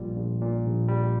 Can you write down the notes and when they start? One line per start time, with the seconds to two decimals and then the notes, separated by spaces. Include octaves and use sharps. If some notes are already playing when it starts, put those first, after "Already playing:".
Already playing: A#1 A#2 G3
0.17 A#1
0.41 A#2
0.65 A#1
0.88 G3